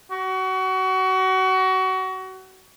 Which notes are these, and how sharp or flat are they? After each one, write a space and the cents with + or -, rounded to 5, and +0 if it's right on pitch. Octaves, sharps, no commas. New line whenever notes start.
F#4 +25